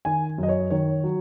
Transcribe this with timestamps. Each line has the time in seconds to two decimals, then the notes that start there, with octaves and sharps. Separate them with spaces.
0.05 D#3 G#5
0.38 F#2
0.43 D#5
0.49 C#5
0.70 D#3 C#5
1.04 F#3